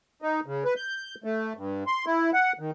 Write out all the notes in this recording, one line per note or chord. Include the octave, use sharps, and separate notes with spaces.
D#4
C#3
B4
G6
A3
G2
C6
E4
F#5
D#3